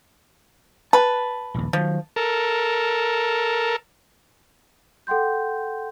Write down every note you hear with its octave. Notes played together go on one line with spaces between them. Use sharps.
B4 A5
A#1 D#2
D#3 F3 F#3
A4 A#4
A4 F#5 G5 C6 G6